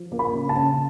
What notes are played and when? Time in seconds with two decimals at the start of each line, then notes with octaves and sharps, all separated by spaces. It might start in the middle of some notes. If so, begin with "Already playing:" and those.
Already playing: F3
0.12 A#3
0.19 B5
0.35 C#3
0.49 A5
0.56 C#3